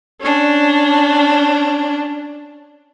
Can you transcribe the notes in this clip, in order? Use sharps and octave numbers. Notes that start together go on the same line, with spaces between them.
C#4 D4